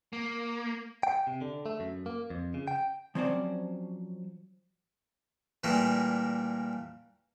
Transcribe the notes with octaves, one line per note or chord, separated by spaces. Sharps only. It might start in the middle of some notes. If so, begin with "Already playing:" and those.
A#3
G5
C3
D3
A3
F#2
A#3
F2
C#3
G5
F3 F#3 C4 C#4 C5 D5
A#2 E3 G3 A3 A#3